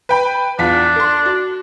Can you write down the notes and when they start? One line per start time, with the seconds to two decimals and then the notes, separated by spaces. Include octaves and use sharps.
0.09 B4 G5 B5
0.59 E2 D4 F4 B6
0.96 A4 C6
1.26 F#4